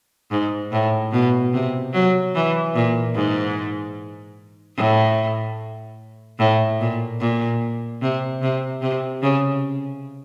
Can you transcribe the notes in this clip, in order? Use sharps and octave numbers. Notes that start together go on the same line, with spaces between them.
G#2
A2
B2
C3
F#3
E3
A#2
G#2
A2
A2
A#2
A#2
C3
C3
C3
C#3